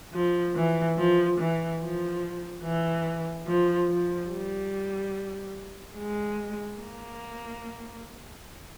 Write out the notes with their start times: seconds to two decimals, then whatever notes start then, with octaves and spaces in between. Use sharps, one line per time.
0.13 F3
0.55 E3
0.98 F3
1.39 E3
1.81 F3
2.64 E3
3.47 F3
3.89 F3
4.30 G3
5.97 G#3
6.80 A#3